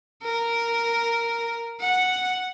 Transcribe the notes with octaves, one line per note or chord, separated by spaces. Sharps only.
A#4
F#5